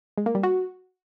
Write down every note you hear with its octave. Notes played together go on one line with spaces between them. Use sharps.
G#3
A#3
G3
F#4